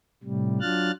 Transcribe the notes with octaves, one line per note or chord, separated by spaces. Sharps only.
A2 C3 G3
F#3 D4 F4 F6 F#6 A6